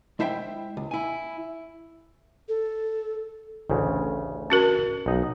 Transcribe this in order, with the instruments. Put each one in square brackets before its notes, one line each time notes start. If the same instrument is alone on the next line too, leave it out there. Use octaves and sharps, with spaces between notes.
[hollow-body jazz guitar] G#3 E4 C5 E5 F#5 G5
C#2
E4 G#5
[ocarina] A4
[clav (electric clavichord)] A1 D2 C#3
[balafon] C#4 F#4 A#4
[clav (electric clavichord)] B1 D#4